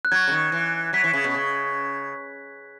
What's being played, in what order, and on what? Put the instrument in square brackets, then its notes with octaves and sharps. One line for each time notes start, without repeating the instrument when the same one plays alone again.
[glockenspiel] F#6
[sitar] F#3 [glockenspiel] G#6
[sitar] C#3
D#3
E3
[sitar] F#3 [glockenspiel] B6
[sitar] E3
C#3
B2
C#3